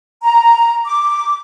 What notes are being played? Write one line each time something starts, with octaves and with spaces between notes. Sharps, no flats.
A#5
D6